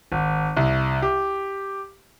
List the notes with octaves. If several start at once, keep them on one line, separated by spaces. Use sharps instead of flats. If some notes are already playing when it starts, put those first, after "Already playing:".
G#1
C2
G4